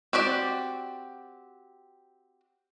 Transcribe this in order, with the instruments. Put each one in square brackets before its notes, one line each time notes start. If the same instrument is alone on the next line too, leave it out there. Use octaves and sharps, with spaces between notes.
[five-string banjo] C4 F#4 G4 D5